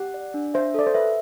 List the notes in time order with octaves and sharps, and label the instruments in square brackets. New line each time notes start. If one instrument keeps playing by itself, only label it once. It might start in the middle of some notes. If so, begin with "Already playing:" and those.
Already playing: [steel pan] G4 [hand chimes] F#5
[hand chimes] D5
D4
[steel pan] C5 [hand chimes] E5
[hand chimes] A4 [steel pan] D5
[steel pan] C5
[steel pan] B4 [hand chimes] E5